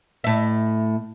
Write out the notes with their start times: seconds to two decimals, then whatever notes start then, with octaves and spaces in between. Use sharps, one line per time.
0.24 A2 E5